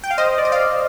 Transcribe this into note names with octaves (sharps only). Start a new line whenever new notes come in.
G5
F5
C5 D#5
D5
D#5
D5 F5